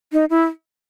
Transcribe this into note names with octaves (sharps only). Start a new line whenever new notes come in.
D#4
E4